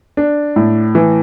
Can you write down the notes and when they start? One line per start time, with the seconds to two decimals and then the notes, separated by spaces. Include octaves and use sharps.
0.17 D4
0.56 A2
0.95 E3